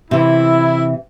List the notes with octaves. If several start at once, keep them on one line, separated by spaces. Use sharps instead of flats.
C3 E3 E4